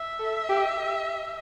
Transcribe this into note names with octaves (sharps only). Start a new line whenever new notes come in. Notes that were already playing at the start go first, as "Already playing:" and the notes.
Already playing: E5
A4
G4